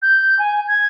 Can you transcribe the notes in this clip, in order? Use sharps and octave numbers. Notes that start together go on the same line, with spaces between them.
G6
G#5
G#6